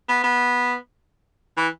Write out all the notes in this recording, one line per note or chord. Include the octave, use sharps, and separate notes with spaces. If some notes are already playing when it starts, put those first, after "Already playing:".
B3
B3
E3